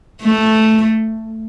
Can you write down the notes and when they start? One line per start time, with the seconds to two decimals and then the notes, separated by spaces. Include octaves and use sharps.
0.22 A3